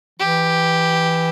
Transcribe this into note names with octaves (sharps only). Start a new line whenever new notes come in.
E3 G4